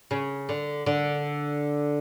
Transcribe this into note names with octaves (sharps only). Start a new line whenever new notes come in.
C#3
D3
D3